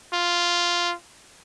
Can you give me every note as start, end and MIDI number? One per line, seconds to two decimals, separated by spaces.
0.13 0.94 65